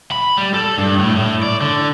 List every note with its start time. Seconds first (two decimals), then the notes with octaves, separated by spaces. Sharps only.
0.12 B5
0.37 G3
0.54 A4
0.78 G2
0.99 A2
1.17 A2
1.43 D5
1.61 D3